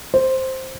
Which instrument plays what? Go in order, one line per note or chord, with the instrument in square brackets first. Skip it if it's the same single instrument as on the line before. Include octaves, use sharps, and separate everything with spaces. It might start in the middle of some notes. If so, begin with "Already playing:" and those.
[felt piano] C5